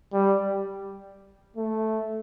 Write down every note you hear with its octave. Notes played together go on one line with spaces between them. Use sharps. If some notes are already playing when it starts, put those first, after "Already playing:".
G3
A3